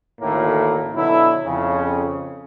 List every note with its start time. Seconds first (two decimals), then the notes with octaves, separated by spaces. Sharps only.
0.21 A1 D2 A2 D#3 A#3
0.96 B2 D3 F#3 E4
1.45 F2 C#3